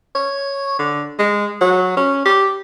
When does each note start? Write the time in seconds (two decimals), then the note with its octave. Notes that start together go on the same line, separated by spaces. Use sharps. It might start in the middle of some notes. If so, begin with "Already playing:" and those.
0.15 C#5
0.79 D3
1.19 G#3
1.61 F#3
1.97 C#4
2.26 G4